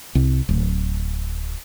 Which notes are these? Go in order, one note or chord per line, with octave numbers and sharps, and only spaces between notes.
C2
D1